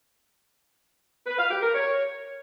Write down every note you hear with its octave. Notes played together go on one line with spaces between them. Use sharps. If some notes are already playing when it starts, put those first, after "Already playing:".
B4
F5
G4
A#4
C#5